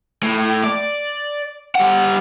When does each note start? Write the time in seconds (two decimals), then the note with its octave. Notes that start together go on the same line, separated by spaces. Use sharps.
0.23 A2
0.64 D5
1.75 G3 F#5